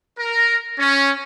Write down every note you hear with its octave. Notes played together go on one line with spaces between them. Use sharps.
A#4
C#4